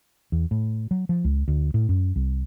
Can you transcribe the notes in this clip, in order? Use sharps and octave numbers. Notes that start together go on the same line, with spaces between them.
E2
A2
F#3
F3
C#2
D2
A2
F#2
C2